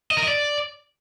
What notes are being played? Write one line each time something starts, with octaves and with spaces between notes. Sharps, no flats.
D#5
A#4
D#5
D5